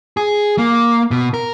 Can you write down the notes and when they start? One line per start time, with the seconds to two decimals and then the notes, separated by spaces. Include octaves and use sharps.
0.17 G#4
0.58 A#3
1.11 B2
1.34 A#4